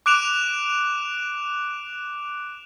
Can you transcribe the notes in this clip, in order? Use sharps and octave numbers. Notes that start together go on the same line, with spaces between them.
D6 F#6 D7 E7 F7